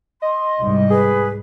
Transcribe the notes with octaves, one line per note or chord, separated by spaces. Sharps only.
D#5 C6
C2 G#2 G3
G#4 B4